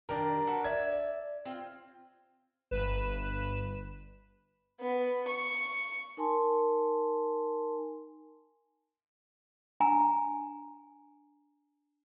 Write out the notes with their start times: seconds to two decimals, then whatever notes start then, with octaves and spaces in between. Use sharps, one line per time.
0.09 D#3 G3 D4 A#4
0.47 F#4 A4 B4
0.64 D5 E5 G#6
1.45 C4 F4
2.71 G1 B4 E7
4.81 B3
5.29 C#6
6.17 D#4 A#4 G#5 A5 C6
9.80 D4 G#5 A#5